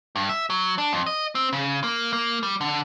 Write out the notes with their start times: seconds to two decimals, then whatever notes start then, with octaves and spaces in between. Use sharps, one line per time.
0.16 G2
0.29 E5
0.50 F#3
0.78 D4
0.93 F2
1.06 D#5
1.35 C4
1.53 C#3
1.83 A#3
2.13 A#3
2.43 G3
2.61 D3